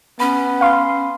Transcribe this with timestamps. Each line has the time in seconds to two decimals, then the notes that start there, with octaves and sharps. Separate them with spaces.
0.20 B3 C#4 B5
0.61 F5 C6